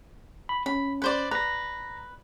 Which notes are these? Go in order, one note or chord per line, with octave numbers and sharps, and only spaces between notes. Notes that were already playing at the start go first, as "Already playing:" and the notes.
B5
C#4 B5
B4 C5 D5
B4 A#5 A#6